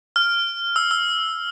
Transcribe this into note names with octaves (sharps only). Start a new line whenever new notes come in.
F6
E6
E6